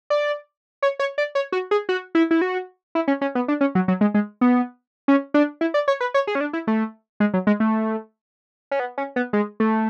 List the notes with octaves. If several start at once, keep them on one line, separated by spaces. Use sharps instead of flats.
D5
C#5
C#5
D5
C#5
F#4
G#4
F#4
E4
E4
F#4
E4
C#4
C#4
B3
D4
C#4
F#3
F#3
G#3
G#3
B3
C#4
D4
E4
D5
C#5
B4
C#5
G#4
C#4
D4
E4
A3
G#3
F#3
G#3
A3
C#4
B3
C#4
B3
G#3
A3